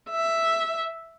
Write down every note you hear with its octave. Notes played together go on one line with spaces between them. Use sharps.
E5